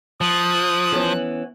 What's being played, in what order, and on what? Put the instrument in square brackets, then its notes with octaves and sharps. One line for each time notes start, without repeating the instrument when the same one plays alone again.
[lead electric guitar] F3 [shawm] D#6 [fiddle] F#6
[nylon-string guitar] E3 B3 C#4